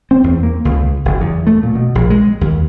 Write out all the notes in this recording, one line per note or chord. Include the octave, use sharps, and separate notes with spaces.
C4
E2
A#3
C#2
F#1
E2
A3
A#2
B2
A#1
G#3
D#2